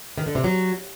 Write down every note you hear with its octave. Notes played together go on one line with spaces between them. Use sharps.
D#3
D3
C3
F#3